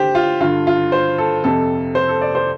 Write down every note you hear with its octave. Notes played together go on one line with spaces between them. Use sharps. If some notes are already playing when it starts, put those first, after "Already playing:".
Already playing: D3 G4 C5
F4
G2 D3 F4
F4
C5
A4
F2 C3 A4
C5
A4
D5
C5